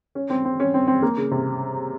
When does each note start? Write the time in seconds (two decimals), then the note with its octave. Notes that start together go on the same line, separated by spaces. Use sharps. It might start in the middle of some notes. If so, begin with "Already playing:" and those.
0.15 C#4
0.30 C4
0.45 C4
0.60 C#4
0.74 C4
0.87 C4
1.02 A#3
1.17 C#3
1.31 C3